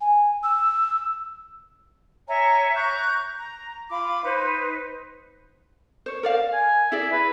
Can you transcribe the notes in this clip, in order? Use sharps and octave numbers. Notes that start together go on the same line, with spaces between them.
G#5
E6
C#5 E5 G#5 A#5
A#5 C#6 F#6 G6
A#5
F4 B5 D6
D#4 B4 C5
C5 C#5
A#4 D5 F5
G#5
E4 G#4 D5 E5
B4